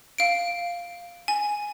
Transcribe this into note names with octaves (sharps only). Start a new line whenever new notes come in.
F5 D7
G#5